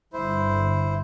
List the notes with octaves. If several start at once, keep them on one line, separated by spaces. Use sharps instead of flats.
G1 E4 C5